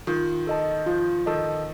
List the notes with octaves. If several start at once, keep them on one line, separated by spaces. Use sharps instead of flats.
D#3 F4
A4 D#5 A5
F3 F4
D#3 A4 D#5 A5